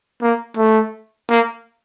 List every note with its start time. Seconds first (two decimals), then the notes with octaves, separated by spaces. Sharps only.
0.22 A#3
0.57 A3
1.30 A#3